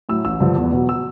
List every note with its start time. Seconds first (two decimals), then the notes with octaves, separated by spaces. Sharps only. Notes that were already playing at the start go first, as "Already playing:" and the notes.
0.09 A2 F#3 E6
0.25 A1 E6
0.40 G2 D3 F3
0.56 E2
0.72 B2 F#3
0.89 E6